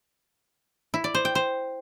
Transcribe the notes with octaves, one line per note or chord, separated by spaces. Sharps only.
E4
D5
C5
G5
C5